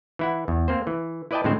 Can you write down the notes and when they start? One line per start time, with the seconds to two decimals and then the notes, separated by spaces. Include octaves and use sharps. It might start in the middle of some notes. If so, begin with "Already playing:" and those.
0.19 E3 E4 F#5
0.48 E2
0.68 A#3 C4 C5
0.87 E3
1.31 E4 B4 D5 D#5 G5 A5
1.44 A2 D3 G#3 C4 C5